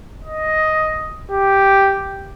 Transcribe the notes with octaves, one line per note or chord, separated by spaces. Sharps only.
D#5
G4